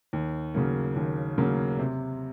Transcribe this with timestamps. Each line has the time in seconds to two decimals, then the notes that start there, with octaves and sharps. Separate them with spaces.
0.13 D#2
0.54 C#3 F#3 A#3
0.96 D#2
1.38 C#3 F#3 A#3
1.79 C3